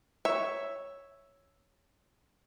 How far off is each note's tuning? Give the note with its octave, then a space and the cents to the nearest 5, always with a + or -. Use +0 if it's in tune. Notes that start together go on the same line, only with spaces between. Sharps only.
C#5 +0 E5 +0